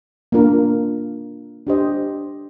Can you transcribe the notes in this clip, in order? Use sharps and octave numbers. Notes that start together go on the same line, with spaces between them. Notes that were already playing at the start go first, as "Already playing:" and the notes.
A#3 D4 F4 A#4
D4 G4 C5 D#5